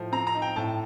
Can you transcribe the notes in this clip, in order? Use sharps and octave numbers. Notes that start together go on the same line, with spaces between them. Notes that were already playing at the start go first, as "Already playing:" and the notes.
Already playing: A2 F3
C4 A#5
A#5
D#4
G5
A2 A5